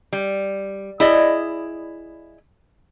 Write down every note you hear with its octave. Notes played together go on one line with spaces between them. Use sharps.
G3
E4 G#4 D5 D#5